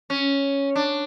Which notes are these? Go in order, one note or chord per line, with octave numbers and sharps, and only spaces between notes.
C#4
D4